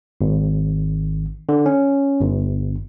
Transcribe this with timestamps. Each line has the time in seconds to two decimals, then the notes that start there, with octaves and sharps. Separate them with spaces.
0.21 G#1
1.49 D3
1.66 C#4
2.21 G1